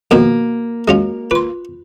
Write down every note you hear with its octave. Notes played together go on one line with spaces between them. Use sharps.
F2 B2 D#3 A#3 F#4
G#3 C#4 F4 F#4
F4 B4 C6